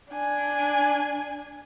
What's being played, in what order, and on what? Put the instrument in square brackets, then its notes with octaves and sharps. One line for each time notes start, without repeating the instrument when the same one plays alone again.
[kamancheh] D4 G#5